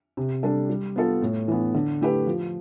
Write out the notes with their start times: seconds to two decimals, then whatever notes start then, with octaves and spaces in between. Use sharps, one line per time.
0.17 C3
0.43 G3 D4 A4
0.70 G3
0.96 B3 F4 A4
1.22 A2
1.48 E3 B3
1.74 D3
2.01 A3 E4 G4 B4
2.27 F3